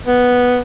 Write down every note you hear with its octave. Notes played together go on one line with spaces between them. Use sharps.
B3